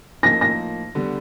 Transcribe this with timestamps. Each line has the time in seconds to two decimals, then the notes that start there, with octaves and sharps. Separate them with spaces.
0.23 A2 F3 A#3 D#4 A#6
0.41 A#6
0.95 D3 G3 B3